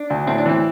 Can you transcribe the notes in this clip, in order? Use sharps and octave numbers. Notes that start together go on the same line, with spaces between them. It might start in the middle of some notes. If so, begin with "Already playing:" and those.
Already playing: D4
D2
A2 C4
D4
E3 C4